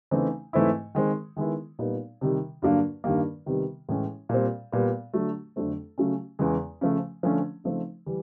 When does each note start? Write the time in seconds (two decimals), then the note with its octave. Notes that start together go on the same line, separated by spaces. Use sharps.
0.11 C#3 E3 A3 C4 D#4
0.53 G#2 E3 A3 C4 E4
0.95 D#3 G#3 C4
1.36 D#3 G#3 B3 E4
1.79 A#2 G3 B3 D#4
2.21 C3 D#3 G3
2.62 G2 D3 F#3 A#3
3.04 G2 D#3 G3 A#3
3.46 C3 D#3 G3 B3
3.89 A2 E3 G#3 C#4
4.29 A#2 G3 C4
4.72 A#2 G3 B3
5.13 D3 F#3 A3
5.56 F2 D3 F#3 A3 C4
5.98 C#3 F#3 A3 C#4
6.39 E2 C#3 E3 G#3
6.81 C#3 F3 A3
7.23 D3 F3 A3 C#4
7.64 C#3 F3 A3 C4 D#4
8.06 E3 G3